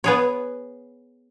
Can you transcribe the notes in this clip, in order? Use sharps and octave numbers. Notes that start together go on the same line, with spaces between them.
B3 G#4 C#5